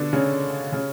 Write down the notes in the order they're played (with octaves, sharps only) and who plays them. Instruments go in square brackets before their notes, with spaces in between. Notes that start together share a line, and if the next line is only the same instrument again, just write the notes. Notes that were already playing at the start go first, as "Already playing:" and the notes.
Already playing: [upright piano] B2 D3 B3 D4
C#3 C#4
C#3 C#4